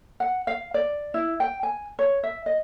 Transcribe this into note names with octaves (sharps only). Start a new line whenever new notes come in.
F#5
F5
D5
E4
G5
G#5
C#5
E5
D#5